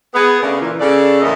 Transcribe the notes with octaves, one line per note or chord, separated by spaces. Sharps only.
B3 G#4
C#3 A3 B3 D4 A#4
A#2 E3
C#3 A4 D5
E2 A2 A#3 B3 E4 D#5